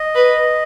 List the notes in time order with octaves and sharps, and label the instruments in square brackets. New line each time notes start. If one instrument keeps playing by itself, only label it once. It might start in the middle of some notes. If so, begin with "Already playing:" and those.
Already playing: [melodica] D#5
[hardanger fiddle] B4